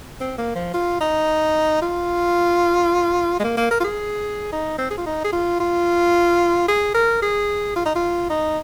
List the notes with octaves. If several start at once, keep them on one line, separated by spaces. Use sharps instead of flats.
C4
A#3
F3
F4
D#4
F4
G#3
A#3
A#3
A#4
F4
G#4
D#4
C4
G#4
F4
D#4
G#4
F4
F4
G#4
A#4
G#4
F4
D#4
F4
D#4